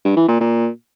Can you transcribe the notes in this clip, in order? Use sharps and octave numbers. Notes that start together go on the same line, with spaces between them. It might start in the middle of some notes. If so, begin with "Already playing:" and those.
G2
E3
A#2
A#2